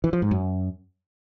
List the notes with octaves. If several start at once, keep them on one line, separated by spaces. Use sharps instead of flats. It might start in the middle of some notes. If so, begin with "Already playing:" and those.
E3
F3
G#2
F#2